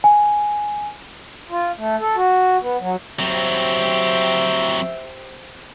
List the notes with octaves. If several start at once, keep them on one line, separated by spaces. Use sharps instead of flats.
G#5
F4
A3
A4
F#4
B3
F#3
F#3 C4 G4 C5 E5